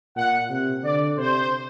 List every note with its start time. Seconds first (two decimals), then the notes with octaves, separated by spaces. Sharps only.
0.16 A#2 F#5
0.50 C3
0.84 D3 D5
1.17 C3 C5